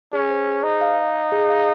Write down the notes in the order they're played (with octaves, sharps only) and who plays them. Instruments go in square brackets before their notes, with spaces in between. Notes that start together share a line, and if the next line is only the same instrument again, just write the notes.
[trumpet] C#4 [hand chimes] G#4
[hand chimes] C5
G#4
[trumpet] D#4 [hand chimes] C5
[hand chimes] F5
F5
F5
G#4
F5